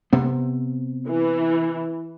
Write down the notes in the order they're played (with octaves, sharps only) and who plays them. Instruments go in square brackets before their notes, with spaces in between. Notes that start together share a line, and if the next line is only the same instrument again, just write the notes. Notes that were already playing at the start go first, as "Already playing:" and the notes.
[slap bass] C3 B3 C4
[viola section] E3